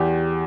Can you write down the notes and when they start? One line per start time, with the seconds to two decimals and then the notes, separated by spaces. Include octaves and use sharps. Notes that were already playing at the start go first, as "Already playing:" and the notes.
Already playing: E2 G4